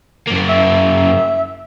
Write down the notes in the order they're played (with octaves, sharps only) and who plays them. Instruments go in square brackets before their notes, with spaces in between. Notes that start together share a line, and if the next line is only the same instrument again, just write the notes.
[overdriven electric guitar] F#2 A#3
[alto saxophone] E5